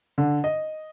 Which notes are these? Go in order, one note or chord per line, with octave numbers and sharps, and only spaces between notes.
D3
D#5